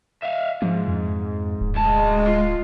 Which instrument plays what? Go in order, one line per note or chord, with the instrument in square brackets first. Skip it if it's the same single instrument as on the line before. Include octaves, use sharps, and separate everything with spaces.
[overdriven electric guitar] E5 F5
[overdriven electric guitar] G#2 [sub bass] F3
[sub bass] F2
D1
[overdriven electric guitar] D2 A5 [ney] G#3
[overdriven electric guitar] F4